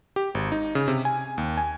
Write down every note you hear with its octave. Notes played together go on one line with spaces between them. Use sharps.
G4
G#1
D#4
C#3
C3
G#5
D#2
G#5